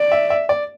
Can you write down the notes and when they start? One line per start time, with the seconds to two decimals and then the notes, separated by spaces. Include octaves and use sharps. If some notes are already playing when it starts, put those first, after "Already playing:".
Already playing: D5
0.12 E5
0.30 E5
0.49 D5